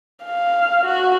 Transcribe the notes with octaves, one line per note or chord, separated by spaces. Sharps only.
F5
F#4